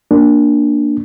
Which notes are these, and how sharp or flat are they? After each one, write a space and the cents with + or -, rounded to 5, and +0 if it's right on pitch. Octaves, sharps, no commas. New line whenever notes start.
A#3 +0 D4 +0